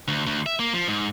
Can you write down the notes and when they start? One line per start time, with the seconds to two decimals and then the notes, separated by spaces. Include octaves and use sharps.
0.08 D2
0.26 D2
0.46 E5
0.59 A#3
0.74 F3
0.88 G#2